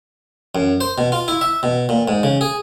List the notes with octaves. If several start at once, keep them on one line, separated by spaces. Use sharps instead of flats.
F#2
C5
B2
F4
E4
E5
B2
A#2
G#2
C#3
G#4